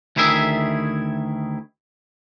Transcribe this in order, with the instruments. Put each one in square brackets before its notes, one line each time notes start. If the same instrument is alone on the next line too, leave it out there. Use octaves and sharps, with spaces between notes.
[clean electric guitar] D2 D#3 E4 G#4 B4 E5